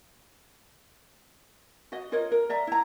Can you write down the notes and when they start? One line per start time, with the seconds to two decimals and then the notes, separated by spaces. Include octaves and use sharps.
1.92 F#4 D#5
2.12 F4 A#4 C#5 D#5
2.32 A#4
2.50 D5 E5 A#5
2.67 E4 A#5